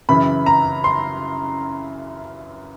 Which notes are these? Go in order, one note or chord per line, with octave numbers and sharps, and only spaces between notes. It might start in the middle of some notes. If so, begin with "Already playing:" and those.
F#2 C#3 E3 B5
A#5
C6